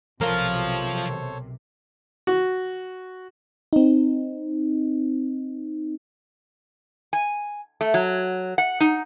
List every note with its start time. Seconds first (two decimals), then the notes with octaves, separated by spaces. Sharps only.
0.21 B1 C3 F3 A4 A#4 C5 C#5 F5
2.27 F#4
3.73 C4 D#4
7.13 G#5
7.81 A3
7.94 F#3
8.58 F#5
8.80 D#4